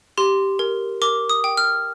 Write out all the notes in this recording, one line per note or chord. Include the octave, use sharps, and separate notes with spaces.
G4 C6
A#4
A#4 D6
D#6
G5
F6